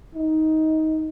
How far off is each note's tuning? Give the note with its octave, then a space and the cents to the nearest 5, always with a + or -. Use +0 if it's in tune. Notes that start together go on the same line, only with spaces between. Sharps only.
D#4 +15